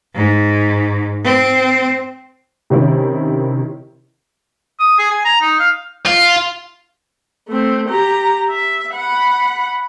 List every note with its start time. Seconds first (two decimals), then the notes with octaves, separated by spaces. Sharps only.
0.15 G#2
1.24 C4
2.70 C3 D#3 C#4 E4
4.79 D#6
4.98 G#4
5.11 G#5
5.25 A#5
5.41 D#4
5.59 F5
6.06 F4
7.48 A3 C4
7.89 G4 A#5
8.49 E5
8.93 F#5 B5